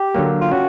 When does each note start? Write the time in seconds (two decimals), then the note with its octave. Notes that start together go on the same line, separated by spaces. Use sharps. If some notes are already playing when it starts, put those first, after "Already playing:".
Already playing: G4
0.15 D3 F#3 A#3
0.41 F4
0.52 C#4 F#4